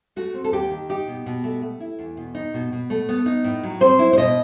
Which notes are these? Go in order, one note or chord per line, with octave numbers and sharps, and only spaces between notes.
A3 F#4
C4
A4
D#2 G4
D#3
D#4 G4
B2
B2
A3
A3
E4
E2
B2
D#4
B2
B2
A3
B3
D#4
A2
F#3
C4 C5
E4
C5
B2 D#5